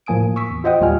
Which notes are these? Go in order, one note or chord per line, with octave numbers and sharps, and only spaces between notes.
A2 F3 A#3 G#5 D#6 D7
C#6 D#6 E6 B6
E2
F4 C5 D#5 F#5 G5 D#6
D#2 A#2 G3 F4 G#5 F6